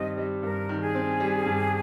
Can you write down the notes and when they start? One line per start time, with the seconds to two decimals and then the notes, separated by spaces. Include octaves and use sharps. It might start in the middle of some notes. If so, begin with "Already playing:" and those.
Already playing: G2 D#3 G3 C4 D#5
0.17 G3
0.43 G2 A#4
0.69 D#3
0.81 G#4
0.95 C4
1.20 G3
1.46 G2